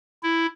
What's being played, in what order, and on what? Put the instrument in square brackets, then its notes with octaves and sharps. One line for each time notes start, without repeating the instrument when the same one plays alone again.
[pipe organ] E4